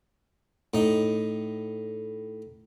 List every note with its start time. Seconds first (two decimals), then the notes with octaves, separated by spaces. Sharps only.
0.74 A2 D#4